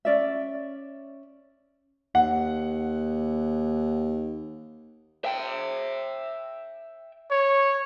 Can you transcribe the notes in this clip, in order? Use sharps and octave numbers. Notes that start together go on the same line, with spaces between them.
C#4 D5 E5
D#2 F#5
E5 G5
C#5